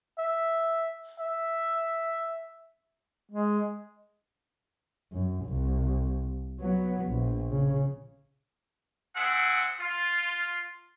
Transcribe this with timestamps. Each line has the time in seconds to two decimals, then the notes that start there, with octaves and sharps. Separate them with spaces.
0.19 E5
1.20 E5
3.29 G#3
5.12 F#2
5.45 C2
6.60 F#3 B3
7.06 A#1
7.51 C#3
9.16 C4 G#4 E5 F#5
9.80 F4